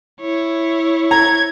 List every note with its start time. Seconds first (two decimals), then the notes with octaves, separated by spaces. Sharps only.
0.21 E4 C#5
1.11 A#5 G#6